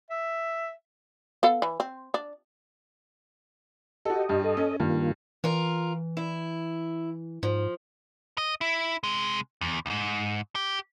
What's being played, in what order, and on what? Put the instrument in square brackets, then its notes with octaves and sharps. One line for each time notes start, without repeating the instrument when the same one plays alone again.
[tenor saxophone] E5
[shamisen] B3 A4 F5
E3
C4
D4
[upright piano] F#4 A4 [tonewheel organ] G4 D#5
[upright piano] G2
[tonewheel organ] A4 D#5
[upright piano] C#4
[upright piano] G2 [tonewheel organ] D#3 A#3 F4
[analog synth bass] E3 [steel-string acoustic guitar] F4 A#4
[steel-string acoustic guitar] E4
[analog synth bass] G#2 [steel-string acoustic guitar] F3
[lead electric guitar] D#5
E4
C3 G#3
E2
D2 G#2
G4